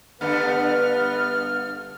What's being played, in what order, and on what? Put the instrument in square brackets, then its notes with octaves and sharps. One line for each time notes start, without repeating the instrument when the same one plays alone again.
[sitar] G2 D3 A3 [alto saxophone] B3 [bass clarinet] B4 [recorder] F6